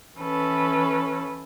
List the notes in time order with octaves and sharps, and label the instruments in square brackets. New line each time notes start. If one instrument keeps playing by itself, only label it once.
[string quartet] E3 C#4 A4 B4